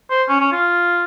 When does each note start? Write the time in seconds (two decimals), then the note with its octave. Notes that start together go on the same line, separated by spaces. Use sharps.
0.10 C5
0.28 C#4
0.40 C#4
0.52 F4